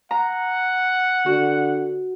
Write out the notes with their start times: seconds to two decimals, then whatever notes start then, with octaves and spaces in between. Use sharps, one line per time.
0.11 F#5 A#5
1.26 D3 F#4